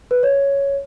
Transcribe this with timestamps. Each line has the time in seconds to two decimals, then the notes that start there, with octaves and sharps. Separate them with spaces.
0.11 B4
0.23 C#5